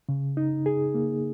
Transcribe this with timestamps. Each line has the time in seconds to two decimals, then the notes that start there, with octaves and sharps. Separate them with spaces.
0.09 C#3
0.37 D#4
0.66 G#4
0.95 A#3